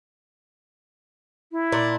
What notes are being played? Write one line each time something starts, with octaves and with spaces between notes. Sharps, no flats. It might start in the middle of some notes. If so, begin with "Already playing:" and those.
E4
A#2 D4